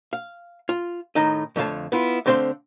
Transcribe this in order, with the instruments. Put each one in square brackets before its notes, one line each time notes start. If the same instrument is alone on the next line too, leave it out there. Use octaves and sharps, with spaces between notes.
[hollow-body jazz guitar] F5
F4
A2 D#3 D#4 D#5
F2 D3 A3 C#5 F5 A5
B3 E4 F4
D3 A3 C4 C5 F5 C6